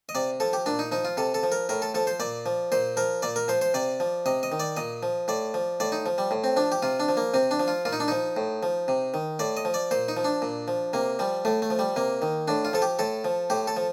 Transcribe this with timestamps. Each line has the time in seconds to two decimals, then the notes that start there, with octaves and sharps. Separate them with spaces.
0.09 D#5
0.15 C3 D5
0.40 F3 A4
0.53 G4
0.66 A#2 D4
0.79 D#4
0.92 F3 D#4
1.05 F4
1.17 C3 A4
1.34 A4
1.43 F3
1.52 A#4
1.69 A2 A#4
1.82 A4
1.94 F3 A4
2.07 C5
2.20 A#2 D5
2.46 F3
2.72 A#2 C5
2.97 F3 A#4
3.22 A#2 D5
3.36 A#4
3.48 F3 C5
3.61 C5
3.74 C3 D5
4.00 F3
4.26 C3 D#5
4.43 D#5
4.52 D#3
4.60 D5
4.77 A#2 D#5
5.03 F3
5.28 A2 D5
5.54 F3
5.80 A2 D5
5.92 D#4
6.06 F3
6.18 G3
6.31 A2
6.44 C4
6.57 F3 D4
6.72 G4
6.82 C3 F4
7.00 D4
7.08 F3
7.17 A#3
7.34 C3 C4
7.51 D4
7.60 F3
7.68 F4
7.85 A#2 F4
7.93 D#4
8.00 D4
8.08 F3 D#4
8.37 A2
8.63 F3
8.88 C3
9.14 D#3
9.39 A2 D5
9.57 D#5
9.65 F3
9.74 D5
9.91 A#2 C5
10.08 D#4
10.17 F3
10.24 D4
10.42 A#2
10.68 F3
10.93 C3 A#3
11.19 F3 G3
11.45 A2 A3
11.62 A3
11.70 F3
11.79 G3
11.96 C3 A#3
12.22 D#3
12.48 A2 D4
12.65 F4
12.73 F3 A4
12.82 G4
12.99 A2 A4
13.25 F3
13.50 A2 G4
13.67 A4
13.77 F3